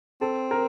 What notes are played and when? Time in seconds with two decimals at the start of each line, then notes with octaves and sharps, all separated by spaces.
0.21 C4 A4
0.51 A#4